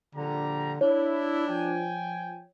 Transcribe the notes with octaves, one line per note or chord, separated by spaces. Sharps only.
A#1 D3 G3 A#5
D4 E4 C#5
F3 G5 G#5